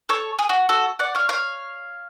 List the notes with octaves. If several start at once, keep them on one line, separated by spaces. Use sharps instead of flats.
A4 C#5
G#4
F#4
F#4 A4
D5 F#5
C#5 F5
C#5 F5